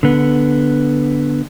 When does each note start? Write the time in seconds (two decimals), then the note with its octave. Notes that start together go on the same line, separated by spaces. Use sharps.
0.03 D3 B3